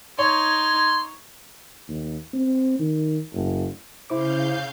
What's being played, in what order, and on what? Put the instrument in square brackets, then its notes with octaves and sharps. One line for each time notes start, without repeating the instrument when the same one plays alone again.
[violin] D#4 [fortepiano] C#5 [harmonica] C6 [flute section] G#6
[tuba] D#2
C4
D#3
F#1
[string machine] C#3 F5 G6 [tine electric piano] E4 C5 D6